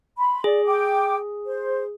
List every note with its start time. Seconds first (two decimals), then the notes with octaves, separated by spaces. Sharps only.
0.18 B5 C6
0.44 G#4 D5
0.65 G5 D6
1.46 C5